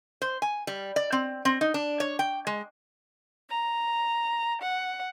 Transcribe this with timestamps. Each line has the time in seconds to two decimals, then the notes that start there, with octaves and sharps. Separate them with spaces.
0.22 C5
0.42 G#5
0.67 G3
0.96 D5
1.12 C4
1.45 C4
1.61 D#4
1.74 D4
2.00 C#5
2.19 G5
2.47 G#3
3.50 A#5
4.61 F#5